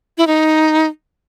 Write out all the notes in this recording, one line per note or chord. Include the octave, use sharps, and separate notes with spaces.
E4
D#4